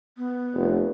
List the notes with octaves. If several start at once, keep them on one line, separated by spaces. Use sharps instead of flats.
B3
F1